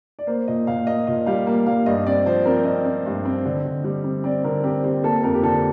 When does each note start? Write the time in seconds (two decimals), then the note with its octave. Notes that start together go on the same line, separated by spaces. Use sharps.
0.19 D5
0.27 A#3 C5
0.48 A#2 D#5
0.67 A#2 F5
0.87 A#3 D#5
1.07 A#2 D#5
1.26 G3 F5
1.47 A#3 F5
1.67 G3 F5
1.86 G2 D#5
2.07 C4 D5
2.26 F3 C5
2.45 C4 A#4
2.65 C4 D#5
2.85 C4
3.06 G2
3.25 C4
3.45 D3
3.65 D3
3.84 G3
4.04 C4
4.24 C4 D5
4.44 D3 A#4
4.64 C4 G4
4.83 C4 G4
5.03 A#3 A4
5.23 F2 A#4
5.34 G4
5.43 D3 A4